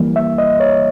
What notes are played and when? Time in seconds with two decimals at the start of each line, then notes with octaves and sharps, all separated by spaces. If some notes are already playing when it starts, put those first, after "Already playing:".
Already playing: E3 G3 A#3
0.16 E5
0.38 D#5
0.60 C#5